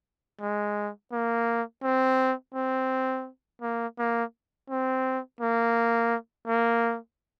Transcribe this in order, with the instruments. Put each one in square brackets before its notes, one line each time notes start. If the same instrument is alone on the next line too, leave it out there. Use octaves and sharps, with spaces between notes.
[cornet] G#3
A#3
C4
C4
A#3
A#3
C4
A#3
A#3